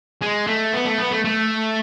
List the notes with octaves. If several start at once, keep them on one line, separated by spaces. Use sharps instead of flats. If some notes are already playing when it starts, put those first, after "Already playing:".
G#3
A3
B3
A3
B3
A3
A3